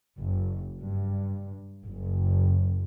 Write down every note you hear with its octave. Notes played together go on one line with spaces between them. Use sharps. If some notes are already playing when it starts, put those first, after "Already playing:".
F#1
G2
F#1